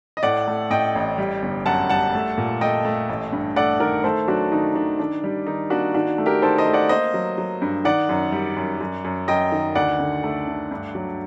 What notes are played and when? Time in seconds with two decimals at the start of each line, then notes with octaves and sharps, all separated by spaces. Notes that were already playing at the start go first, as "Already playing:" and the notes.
0.17 D#5
0.23 A2 D5 F#5
0.47 A3
0.71 A2 D#5 G5
0.95 A1
1.18 G3
1.42 G1
1.66 F#2 F#5 A5
1.89 G3 F#5 A5
2.14 A3
2.38 A#2
2.61 A3 D#5 G5
2.85 A3
3.09 A1
3.32 G2
3.56 A3 D5 F#5
3.80 D#3 A#4 D5
4.04 A3 A4 C5
4.28 F#3 D4 F#4
4.52 D#3 D#4
4.75 D#3 D4
4.99 D#3 D4
5.24 G3
5.47 D#3 D#4
5.70 A#3 D4 F#4
5.94 D#3 D4 F#4
6.18 A3
6.26 G4 A#4
6.42 D#3 A4 C5
6.58 C5 D#5
6.66 A3
6.73 D5 F#5
6.89 A#3 C5 D#5
7.14 F#3
7.38 F#3
7.62 G2
7.85 D#3 D5 F#5
8.09 F#2
8.32 G3
8.57 F#2
8.81 F#2
9.05 F#2
9.28 F#2 D#5 G5
9.52 D#3
9.75 D2 D5 F#5
9.99 D3
10.24 A3
10.48 D3
10.71 G2
10.95 F#3